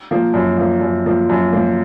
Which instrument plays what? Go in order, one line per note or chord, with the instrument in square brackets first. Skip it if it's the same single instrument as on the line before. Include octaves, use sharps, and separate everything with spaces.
[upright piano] F3 A#3
F#2
F3 A#3
F#2
F3 A#3
F#2
F3 A#3